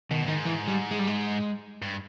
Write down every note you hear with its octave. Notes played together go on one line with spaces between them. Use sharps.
B2 D#3
G2
G#2 D#3
E3
G3
G#3
G3
G#3
G2